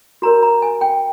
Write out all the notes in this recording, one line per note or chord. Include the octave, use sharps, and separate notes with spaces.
F#4 A#4 C#5 A#5
A#5
G#5
G5